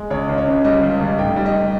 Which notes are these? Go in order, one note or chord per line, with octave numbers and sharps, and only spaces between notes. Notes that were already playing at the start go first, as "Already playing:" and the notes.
Already playing: G#3
C#2 C#5
C#2
C#5
C#3
G3 D#5
C#2
C#2
F1 G5
G3
D#5